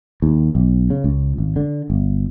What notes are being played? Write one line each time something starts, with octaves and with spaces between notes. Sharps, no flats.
D#2
B1
C#3
C#2
G#1
D3
G1